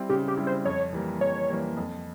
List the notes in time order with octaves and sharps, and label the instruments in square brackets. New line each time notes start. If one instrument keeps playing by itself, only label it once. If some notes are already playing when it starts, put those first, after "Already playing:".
Already playing: [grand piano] G3 C4 E4
[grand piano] C#3 [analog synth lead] G4
[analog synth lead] G4
[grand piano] G3 C4 E4
[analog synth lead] C5
[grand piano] F2 [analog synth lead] C#5
[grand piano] E3 G3 A#3
[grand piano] F2 [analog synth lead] C#5
[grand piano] E3 G3 A#3
F2